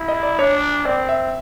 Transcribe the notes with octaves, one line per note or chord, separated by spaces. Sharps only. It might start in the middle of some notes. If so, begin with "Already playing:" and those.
Already playing: E4
D#5
D5
D4 C#5
C4 D5
E5